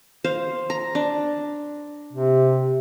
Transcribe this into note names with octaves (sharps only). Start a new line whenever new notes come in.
C5 F5
A#5
D4
C3